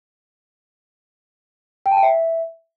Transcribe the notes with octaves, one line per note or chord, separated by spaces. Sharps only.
G5
A5
G5
E5